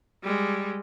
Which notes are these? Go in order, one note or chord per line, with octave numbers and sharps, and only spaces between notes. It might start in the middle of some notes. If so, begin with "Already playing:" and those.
G3 G#3